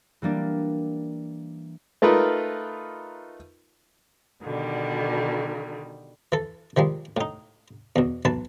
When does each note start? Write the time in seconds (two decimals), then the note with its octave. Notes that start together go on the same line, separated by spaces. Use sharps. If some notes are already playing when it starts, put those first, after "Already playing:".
0.22 E3 G3 A#3 D4
2.02 A3 D#4 F4 A#4 B4
4.42 B2 D3 D#3 G3
6.32 E3 A4
6.77 D#3 F3 G3 G#3
7.17 A2 D#4
7.96 E2 B2
8.25 B1 E3 B4 A5